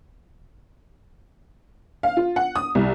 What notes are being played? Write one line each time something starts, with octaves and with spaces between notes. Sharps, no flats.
F5
F4
F#5
D#6
C2